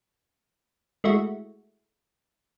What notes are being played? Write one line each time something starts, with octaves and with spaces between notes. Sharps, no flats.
G#3 A3 E4 F#4